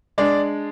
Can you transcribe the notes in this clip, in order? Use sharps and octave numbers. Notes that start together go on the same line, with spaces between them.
G#3 D4 D5